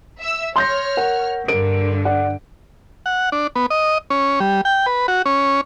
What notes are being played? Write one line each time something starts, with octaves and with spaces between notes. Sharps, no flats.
E5 E6
C#5 C6 F6 G6 A#6
A#4 F#5
G2 D3 A#4 D7
D5 F#5
F#5
D4
B3
D#5
C#4
G3
G5
B4
F#4
C#4